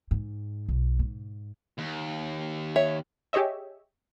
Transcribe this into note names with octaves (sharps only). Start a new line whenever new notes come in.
G#2
B1
G#2
D#2
C#5 E5
G4 G#4 C#5 D#5 E5